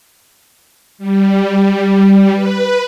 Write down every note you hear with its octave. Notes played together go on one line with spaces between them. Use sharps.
G3
B4